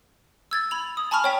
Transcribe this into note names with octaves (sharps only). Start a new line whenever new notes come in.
E6 G#6 A6
B5 F7
D#6
G#5 A5 B5 C#6 F6 F7
C#5 G5 B6